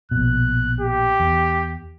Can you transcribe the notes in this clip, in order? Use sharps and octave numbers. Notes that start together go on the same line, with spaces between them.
A#1 B2 F#6
G4
E2